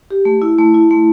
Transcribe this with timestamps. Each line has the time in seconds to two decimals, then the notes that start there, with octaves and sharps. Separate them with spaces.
0.11 G4
0.25 A3
0.42 E4
0.59 A3
0.74 E4
0.91 A3